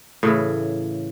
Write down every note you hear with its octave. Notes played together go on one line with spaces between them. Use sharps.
A2 C#3 E3